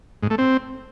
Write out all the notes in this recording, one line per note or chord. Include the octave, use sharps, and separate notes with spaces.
G#2
A3
C4